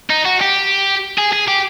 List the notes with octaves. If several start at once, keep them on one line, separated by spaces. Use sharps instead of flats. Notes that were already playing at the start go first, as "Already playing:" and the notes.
D#4
F#4
G4
G#4
G#4
G4